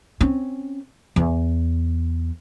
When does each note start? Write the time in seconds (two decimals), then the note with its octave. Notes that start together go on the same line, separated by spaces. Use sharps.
0.21 C4 C#4
1.16 E2